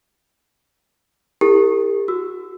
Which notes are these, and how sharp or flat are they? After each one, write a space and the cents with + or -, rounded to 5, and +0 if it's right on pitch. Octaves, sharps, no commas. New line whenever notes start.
E4 +0 G4 +30 A#4 -35
F#4 -15 E6 +0